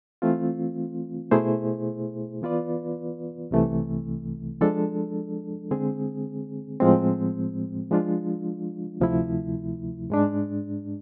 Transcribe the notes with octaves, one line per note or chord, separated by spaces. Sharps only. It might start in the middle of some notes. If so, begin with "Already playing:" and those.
E3 A3 C4 F4
B2 A3 E4 G#4 C5
E3 B3 F4 B4 D5
C2 C3 E3 A3
F3 G#3 D4 A4
D3 G#3 C4 G#4
A2 F3 G#3 C4
F3 G#3 D4 F4
D2 C3 F3 A3 E4
G#2 G#3 D4